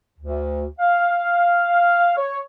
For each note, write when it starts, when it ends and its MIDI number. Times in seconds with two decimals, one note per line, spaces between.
0.19 0.65 38
0.79 2.14 77
2.17 2.39 73